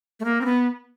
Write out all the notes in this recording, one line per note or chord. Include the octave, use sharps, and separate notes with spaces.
A3
A#3
C4
B3